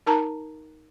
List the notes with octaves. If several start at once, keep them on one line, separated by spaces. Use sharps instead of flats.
D#4 A#4 A5 A#5